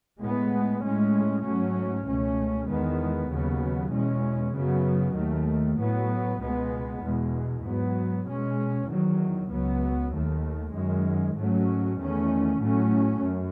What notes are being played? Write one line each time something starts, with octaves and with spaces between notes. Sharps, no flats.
A2 G#3 B3
A2 G#3 C#4
G#2 F#3 A3 C#4
C#2 B2 A3 C#4
E2 D#3 G#3 B3
D#2 C#3 F#3 B3
E2 B2 G#3 C#4
F#2 C#3 F#3 B3
D#2 D#3 A3
A2 F#3 B3
C#2 B2 G#3 B3
E2 B2 G#3
G#2 F#3 B3
B2 G#3 C#4
E2 D#3 F#3
C#2 C#3 F#3 B3
D#2 D#3 A3
F#2 D#3 G#3
G#2 F#3 A3 C#4
E2 D#3 A3 C#4
A2 F#3 A3 C#4
F#2